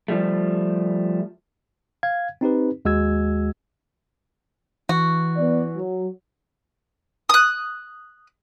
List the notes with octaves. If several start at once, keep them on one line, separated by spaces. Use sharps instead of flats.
F3 G3 A3
F5 G#6
C4 D#4 G4 B4
D#2 G#3 F#4 E6 G#6
E3 F#4
B3 D5
F#3
D#6 F#6